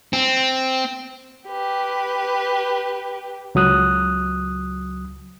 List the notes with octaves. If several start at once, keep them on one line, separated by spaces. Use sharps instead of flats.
C4
G4 B4
C#2 F#3 D#6 F#6